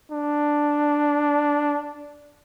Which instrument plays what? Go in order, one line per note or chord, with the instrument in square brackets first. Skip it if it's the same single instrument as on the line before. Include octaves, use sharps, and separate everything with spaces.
[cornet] D4